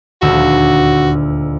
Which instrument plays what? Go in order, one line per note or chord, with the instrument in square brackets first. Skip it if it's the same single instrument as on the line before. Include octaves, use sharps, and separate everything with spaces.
[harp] D#1 D2 E6 [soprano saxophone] F#4